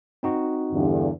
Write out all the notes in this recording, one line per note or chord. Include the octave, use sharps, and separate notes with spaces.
C4 D#4 F#4
E2 G2 D3